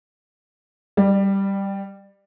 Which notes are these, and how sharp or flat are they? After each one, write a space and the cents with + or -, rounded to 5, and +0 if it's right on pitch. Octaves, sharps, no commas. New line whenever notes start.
G3 +0 D5 +25